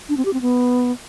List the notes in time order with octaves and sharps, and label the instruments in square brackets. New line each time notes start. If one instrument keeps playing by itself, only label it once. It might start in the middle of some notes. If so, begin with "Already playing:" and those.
[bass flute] D4
C4
G4
C4
B3